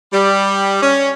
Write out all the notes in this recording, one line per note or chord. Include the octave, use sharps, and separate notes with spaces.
G3
C#4